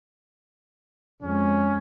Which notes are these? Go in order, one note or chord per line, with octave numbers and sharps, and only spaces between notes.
F2 G#3 C#4